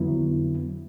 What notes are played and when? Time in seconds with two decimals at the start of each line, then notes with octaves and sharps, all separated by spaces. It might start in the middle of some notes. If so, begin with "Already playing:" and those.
Already playing: F2 D3 F#3 B3 E4